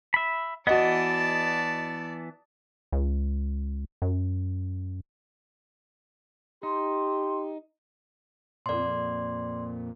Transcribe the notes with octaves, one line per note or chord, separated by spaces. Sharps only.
E5 B5
E3 B3 F#4 D5 D#5 A5
C#2
F#2
D#4 G4 C6
F2 A#2 D5 C6